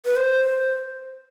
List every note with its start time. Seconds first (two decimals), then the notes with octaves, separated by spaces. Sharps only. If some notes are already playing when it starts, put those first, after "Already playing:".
0.06 B4
0.16 C5